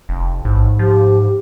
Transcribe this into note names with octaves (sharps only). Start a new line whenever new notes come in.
F1
A1 G#2
F3 G4